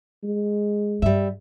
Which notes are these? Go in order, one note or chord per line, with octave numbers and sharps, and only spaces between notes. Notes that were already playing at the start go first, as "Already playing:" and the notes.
G#3
G2 G3 E5